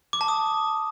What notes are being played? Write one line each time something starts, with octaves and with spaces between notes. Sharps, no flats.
D6
A5
D#6